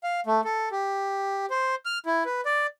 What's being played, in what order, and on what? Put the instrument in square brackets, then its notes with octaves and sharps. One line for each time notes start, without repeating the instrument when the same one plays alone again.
[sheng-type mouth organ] F5
A3
A4
G4
C5
F6
E4
B4
D5